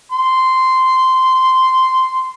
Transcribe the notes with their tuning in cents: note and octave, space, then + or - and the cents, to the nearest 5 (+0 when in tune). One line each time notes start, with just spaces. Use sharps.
C6 -10